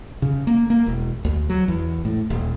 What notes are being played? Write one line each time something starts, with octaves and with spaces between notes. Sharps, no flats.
C#3
A#3
A#3
E1
D2
F#3
E2
A2
D#1